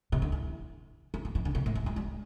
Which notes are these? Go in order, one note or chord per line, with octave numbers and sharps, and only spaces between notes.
C3
D3
E3
E3
F#3
E3
D3
C3
A2
E3
G3
G3